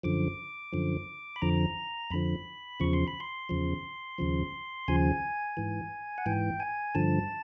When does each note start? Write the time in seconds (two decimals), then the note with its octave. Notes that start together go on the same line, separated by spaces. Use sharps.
0.03 F#2 D3 F3 D6
0.73 F#2 D3 F3
1.36 B5
1.42 F2 D3 F3 A#5
2.11 F2 D3 F3 B5
2.80 E2 C#3 F3 C#6
2.93 C6
3.08 B5
3.20 C6
3.49 E2 C#3 F3
4.18 D#2 C#3 F3
4.88 D#2 C#3 F3 G#5
5.57 G#2 E3
6.18 F#5
6.26 G#2 E3 G5
6.60 G#5
6.95 G2 D3 F3 A5